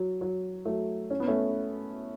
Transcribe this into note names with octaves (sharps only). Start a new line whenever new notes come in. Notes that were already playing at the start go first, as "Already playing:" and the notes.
Already playing: F#3
F#3
F#3 A3
C#4
B3
A3 C#4